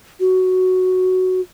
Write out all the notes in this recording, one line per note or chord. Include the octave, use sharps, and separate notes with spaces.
F#4